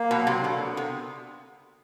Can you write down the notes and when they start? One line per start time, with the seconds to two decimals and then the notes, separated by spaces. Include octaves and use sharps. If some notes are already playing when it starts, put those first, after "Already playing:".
Already playing: A#3
0.11 B2
0.16 F#3
0.27 C3
0.39 D3
0.44 B2
0.61 B3
0.77 C3